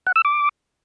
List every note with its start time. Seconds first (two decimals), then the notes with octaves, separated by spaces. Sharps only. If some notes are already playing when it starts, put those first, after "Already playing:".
0.07 F#5
0.16 E6
0.25 D6